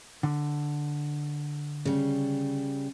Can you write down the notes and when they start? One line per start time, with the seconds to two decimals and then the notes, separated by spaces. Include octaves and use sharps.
0.23 D3
1.85 C#3 G3